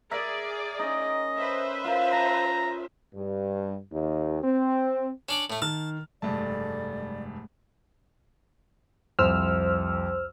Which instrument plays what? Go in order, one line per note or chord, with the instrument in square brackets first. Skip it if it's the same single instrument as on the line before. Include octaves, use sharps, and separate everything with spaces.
[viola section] G#4 D5 [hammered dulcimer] A#4 E5
[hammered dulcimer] C#4 D#4 [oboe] D#5
[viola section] B4 C5 E5
[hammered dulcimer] F4 A#4
[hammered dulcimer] A5 [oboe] A#5
[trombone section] G2
D#2
C4
[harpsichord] C#4 D4 D5 [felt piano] E7
[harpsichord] A2 A3
[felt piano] D#3 F6 [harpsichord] A5
[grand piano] F1 G2 A5 [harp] G#3 A3 [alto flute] D5
[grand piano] C2 F2 [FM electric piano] C5 E6 F6